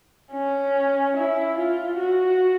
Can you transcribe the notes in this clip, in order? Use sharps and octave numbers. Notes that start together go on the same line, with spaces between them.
C#4
E4
F4
F#4